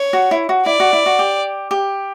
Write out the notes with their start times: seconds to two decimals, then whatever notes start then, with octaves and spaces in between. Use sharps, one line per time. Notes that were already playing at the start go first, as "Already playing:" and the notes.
Already playing: C#5
0.13 F#4
0.31 E4
0.49 F#4
0.66 E4 D5
0.80 F#4
0.93 E4
1.06 F#4
1.19 G4
1.71 G4